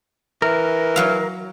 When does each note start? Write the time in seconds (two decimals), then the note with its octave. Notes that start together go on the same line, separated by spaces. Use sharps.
0.42 E3 A#4
0.96 F#3 F5